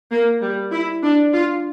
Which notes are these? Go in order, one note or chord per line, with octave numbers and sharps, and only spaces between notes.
A#3
G3
E4
D4
F4